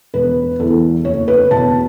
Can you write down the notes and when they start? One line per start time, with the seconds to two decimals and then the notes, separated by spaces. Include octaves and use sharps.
0.14 E1 B4
0.59 E2 E3 A4
1.05 F#1 C#5
1.28 B4
1.51 E2 B2 A5